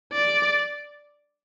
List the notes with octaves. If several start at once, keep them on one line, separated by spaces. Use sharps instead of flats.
D5